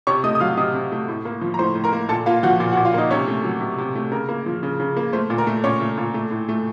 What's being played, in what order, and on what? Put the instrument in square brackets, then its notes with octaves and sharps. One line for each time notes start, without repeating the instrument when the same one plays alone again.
[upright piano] C3 C#5 C#6
A3 D#5 D#6
D#6
F#3 F5 F6
C3 D#5 D#6
C3
A3
A2
A#3
F3
A#5
A2 C5 C6
A2
A#4 A#5
A#3
A#2 A4 A5
A#3 F4 F5
F3 F#4 F#5
A#2
F#4 F#5
A#2
F4 F5
A#3 D#4 D#5
C3 C#4 C#5
A3
F#3
C3
C3
A3
C#3 A#4
A#3
F3
C#3
C#3
A#3
A3 C5
A#2
A#4
A3
A#2 C#4 C#5
A3
A#2
A3
A2
A3